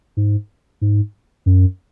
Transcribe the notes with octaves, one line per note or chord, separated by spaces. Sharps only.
G#2
G#2
F#2